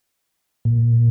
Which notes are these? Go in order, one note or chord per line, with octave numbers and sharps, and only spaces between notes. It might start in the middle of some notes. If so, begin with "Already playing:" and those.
A#2